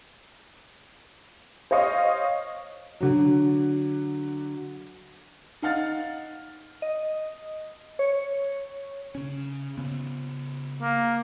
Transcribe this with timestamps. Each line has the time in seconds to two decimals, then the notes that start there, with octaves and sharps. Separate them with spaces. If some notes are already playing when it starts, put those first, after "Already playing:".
1.71 C5 C#5 D#5 F5 C#6 D#6
3.01 D3 F#3
5.62 D#4 F5 F#5 F6 A6
6.82 D#5
7.99 C#5
9.15 C#3 C#4
9.77 C#3 B3
10.81 A#3